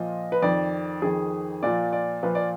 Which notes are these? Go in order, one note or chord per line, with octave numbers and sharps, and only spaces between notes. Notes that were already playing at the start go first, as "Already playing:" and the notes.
Already playing: A#2 F3 D#5
B4
F2 D#3 D5
F2 D#3 G#4
A#2 F3 D5
D5
A#2 F3 B4
D5